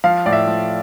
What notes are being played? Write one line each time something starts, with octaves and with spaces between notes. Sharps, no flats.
F3 F5
A2 D5
E5
F3